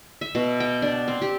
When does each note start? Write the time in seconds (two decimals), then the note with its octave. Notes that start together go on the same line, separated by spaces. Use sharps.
0.21 E5
0.35 B2
0.60 G5
0.82 D4
1.08 C4
1.22 G4